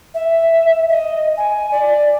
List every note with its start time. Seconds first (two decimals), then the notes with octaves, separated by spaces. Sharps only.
0.14 E5
0.89 D#5
1.37 G#5
1.71 D5